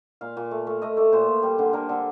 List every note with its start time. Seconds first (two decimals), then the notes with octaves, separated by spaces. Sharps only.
0.21 A#2 F5
0.37 A#2
0.51 A3
0.67 A3
0.82 A3 D#5
0.97 A3 D5
1.12 A#2 C5
1.28 A#2
1.43 G3
1.59 D3
1.73 D3 A#4
1.89 D3 A4